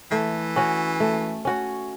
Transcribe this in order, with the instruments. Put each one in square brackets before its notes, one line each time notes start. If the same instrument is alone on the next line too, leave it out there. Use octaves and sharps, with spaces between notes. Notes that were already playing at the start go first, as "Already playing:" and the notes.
[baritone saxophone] E3 [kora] A3
[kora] C#4 F#4 C#5
A3
C#4 F#4 C#5